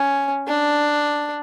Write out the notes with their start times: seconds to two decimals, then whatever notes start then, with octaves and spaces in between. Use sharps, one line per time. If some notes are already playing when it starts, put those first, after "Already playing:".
Already playing: C#4
0.48 D4